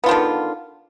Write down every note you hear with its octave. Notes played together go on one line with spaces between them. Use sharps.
D3 D#3 B3 F4